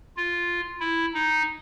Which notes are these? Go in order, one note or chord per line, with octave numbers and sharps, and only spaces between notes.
F4
E4
D#4